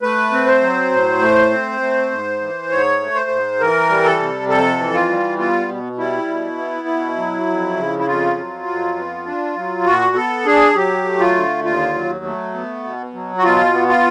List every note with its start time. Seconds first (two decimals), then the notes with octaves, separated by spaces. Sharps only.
0.02 A3 B4
0.32 C4
0.47 C5
0.62 F#3
0.91 A2
1.21 A3
1.51 C4
1.81 A3
2.11 G#2
2.41 E3
2.70 G#2 C#5
3.01 A3
3.15 C5
3.30 G#2
3.60 E3 A#4
3.89 G3
4.04 A4
4.19 C3
4.49 F2 A4
4.79 E3
4.94 F4
5.09 G3
5.38 B3 F4
5.69 B2
5.98 G3 E4
6.28 B2
6.58 B3
6.88 B2
7.17 F#3
7.47 F2
7.77 C#3
7.99 E4
8.07 F2 F4
8.37 F#3
8.67 F2
8.96 B3
9.26 D4
9.56 F#3
9.86 A#2 F#4
10.16 B3 A4
10.45 D4 G#4
10.75 F#3 G4
11.05 A3
11.19 F4
11.35 D3
11.64 D#2 F4
11.95 F#3
12.24 A3
12.54 B3
12.84 B2
13.14 F#3
13.38 F#4
13.43 B2 F4
13.73 B3
13.88 F4